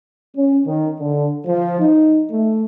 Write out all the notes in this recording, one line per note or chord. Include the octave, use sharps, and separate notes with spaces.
C#4
D#3
D3
F3
D#4
A3